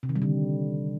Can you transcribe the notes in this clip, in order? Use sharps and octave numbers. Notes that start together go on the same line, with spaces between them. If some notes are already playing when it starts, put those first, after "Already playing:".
C3
D#3
G3
D3